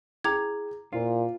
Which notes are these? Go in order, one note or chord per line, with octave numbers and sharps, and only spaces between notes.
E4 G#4 G5 A#5 D6 G#6
A#2 E4 F4 C5